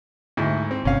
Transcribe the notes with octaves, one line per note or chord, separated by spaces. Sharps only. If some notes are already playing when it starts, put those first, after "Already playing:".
D2 G#2 E4
C4
G1 C3 C#4 F5